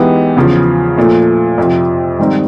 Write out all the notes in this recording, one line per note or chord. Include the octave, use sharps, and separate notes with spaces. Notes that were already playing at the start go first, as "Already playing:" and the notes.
Already playing: E3 G#3 B3 D#4 G4
E2 C#3 F3
A#2 F3 A3
F2 C3 F3
G#2 D#3 G3 C4 D#4